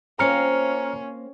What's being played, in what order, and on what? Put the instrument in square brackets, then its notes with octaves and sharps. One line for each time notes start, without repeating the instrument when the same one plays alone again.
[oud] A#3 C4 F4 [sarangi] C#4 [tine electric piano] A#5 F6 C#7